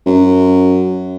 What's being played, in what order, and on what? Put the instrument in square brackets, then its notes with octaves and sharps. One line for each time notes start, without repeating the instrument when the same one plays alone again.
[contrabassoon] F#2